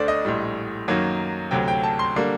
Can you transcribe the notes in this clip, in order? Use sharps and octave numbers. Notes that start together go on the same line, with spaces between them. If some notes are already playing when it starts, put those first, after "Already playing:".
Already playing: D2 D3 A3 C5 D5
D#5
A#1 A2 G3
F#2 D#3 F#3 A#3
D2 C3 F#3 G5
G5
A5
C6
D3 G3 A#3